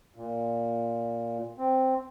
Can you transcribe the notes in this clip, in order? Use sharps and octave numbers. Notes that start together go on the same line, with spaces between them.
A#2
C4